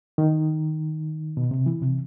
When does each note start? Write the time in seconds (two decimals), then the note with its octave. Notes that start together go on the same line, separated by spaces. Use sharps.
0.18 D#3
1.37 B2
1.51 C3
1.66 E3
1.82 C3